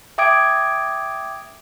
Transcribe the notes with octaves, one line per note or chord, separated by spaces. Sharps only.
E5 G5 D6 D#6 G#6 D7